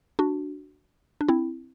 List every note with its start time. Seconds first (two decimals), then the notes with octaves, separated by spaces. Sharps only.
0.19 D4 F#4
1.21 D4
1.28 C4 E4